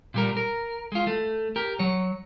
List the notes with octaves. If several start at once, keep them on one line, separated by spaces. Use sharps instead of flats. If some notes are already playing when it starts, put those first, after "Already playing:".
A#2 G3 A#4
A#4
G#3 F4
A3
G4 A#4
F#3 C#5